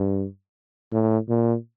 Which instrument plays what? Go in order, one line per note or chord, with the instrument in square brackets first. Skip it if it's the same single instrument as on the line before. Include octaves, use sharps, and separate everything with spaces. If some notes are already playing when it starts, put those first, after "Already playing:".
Already playing: [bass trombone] G2
A2
A#2